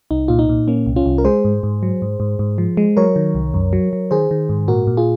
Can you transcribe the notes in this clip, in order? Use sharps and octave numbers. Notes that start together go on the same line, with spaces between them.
C2 D#4
A#2 F4
D#4
A#2
A#3 C#4
C2
C#4 F4
C2
A#4
G#3 G#4 C5
G#2
G#2
F#3
G#2
G#2
G#2
F3
G#3
F#3 A#4 C#5
D#3
C2
F#2
F#3
F#3
D#3 G#4 C5
D#3
G#2
A#2 F#4 A#4
A#2
F4 G#4